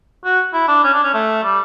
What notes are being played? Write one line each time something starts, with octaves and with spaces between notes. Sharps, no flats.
F#4
E4
D4
C#4
D4
C#4
A3
G3